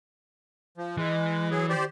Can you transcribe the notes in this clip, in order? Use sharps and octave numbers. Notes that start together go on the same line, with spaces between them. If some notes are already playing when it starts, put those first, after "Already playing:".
F3
E3 G#3
F#3 G#4
G4 C5 D5